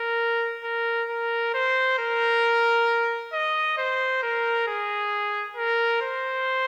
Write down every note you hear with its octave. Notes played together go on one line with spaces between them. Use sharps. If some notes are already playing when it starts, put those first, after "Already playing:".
Already playing: A#4
A#4
A#4
C5
A#4
D#5
C5
A#4
G#4
A#4
C5